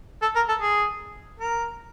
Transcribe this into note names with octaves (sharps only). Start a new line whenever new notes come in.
A4
A#4
A4
G#4
A#4